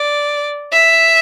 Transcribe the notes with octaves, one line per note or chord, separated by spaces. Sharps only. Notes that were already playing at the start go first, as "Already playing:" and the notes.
Already playing: D5
E5